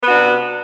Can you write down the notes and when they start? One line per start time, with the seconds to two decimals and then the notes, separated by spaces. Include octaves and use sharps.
0.03 B3
0.06 F#4
0.09 D4
0.12 C3